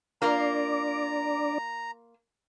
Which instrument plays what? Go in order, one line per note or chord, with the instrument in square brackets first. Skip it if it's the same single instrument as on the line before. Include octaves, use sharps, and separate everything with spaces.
[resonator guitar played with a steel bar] A#3 F4 A#4 [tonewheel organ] D4 D5 [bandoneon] A#5